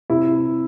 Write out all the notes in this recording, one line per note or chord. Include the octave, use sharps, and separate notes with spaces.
C3 E4